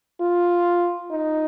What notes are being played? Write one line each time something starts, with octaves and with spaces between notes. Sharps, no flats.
F4
D#4